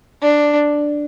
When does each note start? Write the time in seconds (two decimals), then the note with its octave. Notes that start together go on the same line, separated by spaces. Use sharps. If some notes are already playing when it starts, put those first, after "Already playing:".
0.22 D4